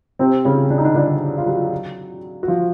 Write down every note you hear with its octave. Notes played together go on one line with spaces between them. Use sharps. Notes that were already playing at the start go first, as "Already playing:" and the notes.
C3 C4
C#3 C#4
D4
D#4
D3 D4
D3 D4
F4
F#3 F#4
F#4
F3 F4